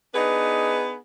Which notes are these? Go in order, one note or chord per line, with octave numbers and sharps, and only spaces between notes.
B3 D4 D#4 G#4 B4